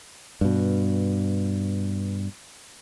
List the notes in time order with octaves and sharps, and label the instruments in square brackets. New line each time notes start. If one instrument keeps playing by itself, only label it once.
[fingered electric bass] G2 B2